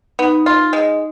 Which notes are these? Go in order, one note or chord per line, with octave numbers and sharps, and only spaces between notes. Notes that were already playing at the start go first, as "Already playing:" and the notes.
B3 D#4
F4
G#3